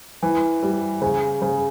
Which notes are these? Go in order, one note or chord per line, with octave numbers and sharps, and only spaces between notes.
E3
G3
C#3
C#3